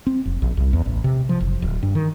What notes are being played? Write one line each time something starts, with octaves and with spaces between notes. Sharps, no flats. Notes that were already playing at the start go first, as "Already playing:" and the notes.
C4
F1
A#1
C2
E2
A1
C3
F3
F#1
D1
G2
D#3